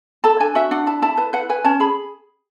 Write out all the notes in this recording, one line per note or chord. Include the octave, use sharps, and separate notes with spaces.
A4 A5
D4 G#5
F#4 E5
D4 F#5
E4 A5
E4 A5
B4 A5
B4 F#5
B4 G#5
C#4 A5
G#4 B5